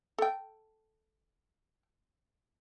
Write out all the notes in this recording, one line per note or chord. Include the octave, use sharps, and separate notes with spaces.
A4 G5